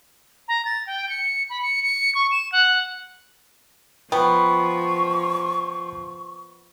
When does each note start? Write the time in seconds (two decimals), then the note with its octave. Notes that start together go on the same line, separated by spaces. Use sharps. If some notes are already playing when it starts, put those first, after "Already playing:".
0.48 A#5
0.65 A6
0.87 G5
1.09 C#7
1.50 B5
1.62 C#7
1.83 C#7
2.15 C#6
2.31 E7
2.52 F#5
4.12 F3 B3 G5 B5 C#6